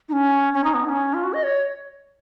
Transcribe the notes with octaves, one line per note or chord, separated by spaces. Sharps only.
D#4
C#4
C#4
D#4
B3
D#4
C#4
F4
F#4
D#5
C#5